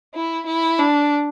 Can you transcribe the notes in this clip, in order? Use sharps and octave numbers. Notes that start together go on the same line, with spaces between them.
E4
E4
D4